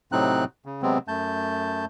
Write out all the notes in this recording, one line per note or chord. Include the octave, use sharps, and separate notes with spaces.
A2 C3 F#3 C4 D#4 F#6
C#3
C3 F#3 G#3 B3 C4
F#2 A3 A5 G6